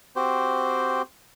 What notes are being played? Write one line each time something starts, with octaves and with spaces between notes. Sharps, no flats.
C4 F#4 G4 C5